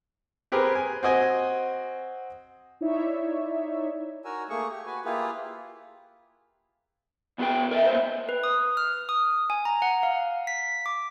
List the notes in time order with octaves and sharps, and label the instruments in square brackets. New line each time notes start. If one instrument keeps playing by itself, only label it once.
[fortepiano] C4 G4 G#4 A#4 B4
G#5
C4 F#4 D#5 G#5
[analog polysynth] D#4 E4 C#5 D5 E5
[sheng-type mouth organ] F#4 A#4 G#5 E6
A3 A#3 G#4 C#6
G4
F#4 B4 G#5
A#3 E4 F4 G4 G#4 B4
[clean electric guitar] E2 B3 F#4 G#4 B4 G5
A#4 D#5 E5
A#3 B3 C5
[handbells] B4
D#6
F6
D#6
G#5
A#5
F#5
F5
B6
D6